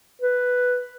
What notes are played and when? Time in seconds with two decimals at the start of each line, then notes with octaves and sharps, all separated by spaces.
0.22 B4